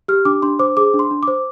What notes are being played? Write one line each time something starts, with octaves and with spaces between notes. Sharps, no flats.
G4 F6
D4 D6
D4 C6
C5 D6
G#4 D6
D4
C6
D4
D6
C5